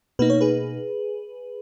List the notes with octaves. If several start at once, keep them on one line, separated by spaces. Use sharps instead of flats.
B2 A#3 D#4 B4
C#5
G#4 B4